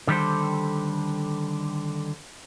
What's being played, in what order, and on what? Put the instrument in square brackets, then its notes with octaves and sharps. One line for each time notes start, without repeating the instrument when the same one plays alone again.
[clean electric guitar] D3 D#3 G3 G4 A4 C5